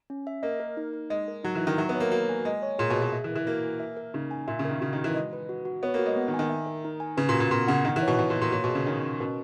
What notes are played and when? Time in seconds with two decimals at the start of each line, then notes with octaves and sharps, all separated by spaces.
0.10 C#4
0.27 E5
0.43 A#3 D#5
0.60 A#4
0.77 D#4
0.93 D#4
1.10 G#3 D#5
1.28 A#4
1.44 F#3 D#4
1.55 E3
1.60 D#4
1.67 D#3
1.78 F#3 E5
1.89 B3
1.95 C#5
2.00 A#3
2.12 A#3 F#4
2.29 G#5
2.45 G#3 G#5
2.62 C#5
2.79 A#2 G#4
2.90 B2
2.96 G#4
3.02 B2
3.12 E5
3.24 E3
3.29 A#4
3.36 E3
3.47 A#3 F#4
3.64 G#5
3.80 E5
3.97 A#4
4.14 C#3 D#4
4.31 G#5
4.48 A#2 E5
4.59 C#3
4.65 D#3 A#4
4.81 C#3 F#4
4.93 D#3 F#4
5.04 E3
5.15 G#3 D#5
5.33 B4
5.49 F#4
5.65 F#4
5.83 B3 C#5
5.94 A#3
5.99 F#4
6.06 G#3
6.16 B3
6.28 D#3
6.34 G#5
6.39 D#3
6.50 E5
6.67 A#4
6.84 D#4
7.00 G#5
7.17 C#3 B4
7.29 A#2
7.34 F#4
7.40 A#2
7.51 A#2 B3
7.68 C#3 F#5
7.85 D#3 F#5
7.96 E3
8.02 C#5
8.08 B2
8.18 B2 F#4
8.30 A#2
8.36 F#4
8.42 A#2
8.52 A#2 C#5
8.64 B2
8.69 G#4
8.75 C#3
8.86 D#3 C#4
9.03 C#4
9.20 B2 A#4